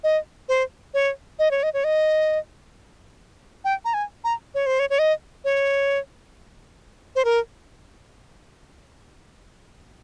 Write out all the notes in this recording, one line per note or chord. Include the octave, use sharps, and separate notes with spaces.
D#5
C5
C#5
D#5
C#5
D#5
C#5
D#5
G5
A#5
G#5
A#5
C#5
C5
C#5
C#5
D#5
C#5
C5
A#4